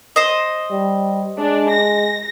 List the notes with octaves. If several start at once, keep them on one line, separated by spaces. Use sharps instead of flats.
C5 D#5
G3
G#3 D4
A#6